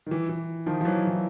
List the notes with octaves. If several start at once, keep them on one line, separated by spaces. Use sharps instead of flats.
D#3
E3
E3
D#3 F3
F3
E3 F#3
E3